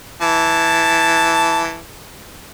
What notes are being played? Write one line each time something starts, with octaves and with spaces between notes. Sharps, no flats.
E3 A5